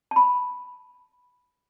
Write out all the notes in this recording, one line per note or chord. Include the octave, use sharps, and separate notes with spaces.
A5
B5